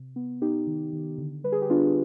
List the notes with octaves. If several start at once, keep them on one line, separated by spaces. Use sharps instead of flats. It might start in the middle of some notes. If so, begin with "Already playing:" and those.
Already playing: C3
B3
B3 D#4 G4
D#3
D#3
D3
G3 B4
G#4
G4
B3 D4 F4